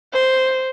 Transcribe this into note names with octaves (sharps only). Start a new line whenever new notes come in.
C5